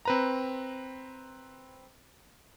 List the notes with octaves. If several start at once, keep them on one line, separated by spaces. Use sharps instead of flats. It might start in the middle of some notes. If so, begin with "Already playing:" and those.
C4 B4 A#5